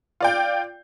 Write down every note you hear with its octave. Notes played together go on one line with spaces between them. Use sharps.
F4 D5 G5